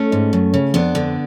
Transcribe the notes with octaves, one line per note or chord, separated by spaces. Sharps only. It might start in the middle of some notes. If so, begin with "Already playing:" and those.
Already playing: A3 C#4
G#2
F#2
C#3
F2 B3 D4
D3